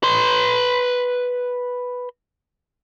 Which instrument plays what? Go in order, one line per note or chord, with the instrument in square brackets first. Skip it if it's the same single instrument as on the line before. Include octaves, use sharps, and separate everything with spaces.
[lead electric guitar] B4 C6